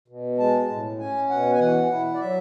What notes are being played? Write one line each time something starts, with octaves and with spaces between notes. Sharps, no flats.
B2
G#3 A5
A2
C#4 G#5
B2 F#5
G#5
E3 F#5
E4
D5
F#3 E5